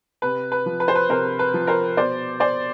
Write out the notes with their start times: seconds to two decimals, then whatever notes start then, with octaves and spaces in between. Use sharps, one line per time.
0.22 C3 B4
0.52 B4
0.66 F3
0.80 B4
0.88 C5
0.95 B4
1.09 C3 A#4 C5
1.39 B4
1.54 F3
1.67 A#4 C5
1.97 B2 C5 D5
2.40 C5 D5